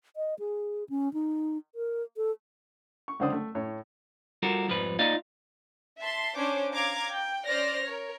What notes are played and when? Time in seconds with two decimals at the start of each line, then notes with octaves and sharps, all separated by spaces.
0.16 D#5
0.39 G#4
0.89 C#4
1.13 D#4
1.75 A#4
2.17 A4
3.08 C#6
3.19 C#2 F#2 D3 C5 D5 D#6
3.32 A3
3.55 A2 C#5
4.43 G3 F4 F#4 A4 A#4
4.68 F2 G#2 F3 G3 B4
4.99 A#3 D#4 F4 D5 D#5 F5
6.00 E5 A5 C6
6.36 C#4 D4 C5 C#5 D6
6.72 F5 A#5 D6 G#6
7.12 G5
7.45 C#4 C5 D5 F6 A#6
7.85 A#4 C#5